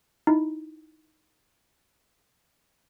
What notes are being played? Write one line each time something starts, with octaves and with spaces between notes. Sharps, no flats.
D#4 E4